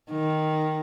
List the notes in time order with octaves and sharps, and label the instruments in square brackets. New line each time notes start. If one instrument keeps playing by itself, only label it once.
[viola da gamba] D#3